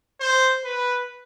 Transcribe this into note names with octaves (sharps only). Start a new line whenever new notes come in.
C5
B4